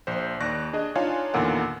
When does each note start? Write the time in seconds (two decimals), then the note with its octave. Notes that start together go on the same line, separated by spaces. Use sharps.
0.07 A#1 C5
0.41 D#2 D5 C#6 F#6 A#6
0.73 D4 G#4 D#5
0.95 D4 D#4 F4 C#5 F5 G#5
1.34 E2 A#2 D3 D#3 F5 F#5